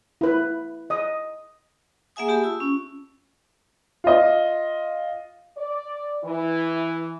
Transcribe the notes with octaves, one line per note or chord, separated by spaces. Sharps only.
E4 B4
D#5 D#6
A#3 G#4 E5 F#5 G#5 D#6
A#3 G4 A5 B5
F4 E6
C#4
F4 D#5
D5
E3